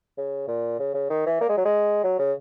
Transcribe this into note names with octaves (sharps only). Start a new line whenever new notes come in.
C#3
A#2
C#3
C#3
D#3
E3
A#3
G#3
F#3
G#3
F#3
C#3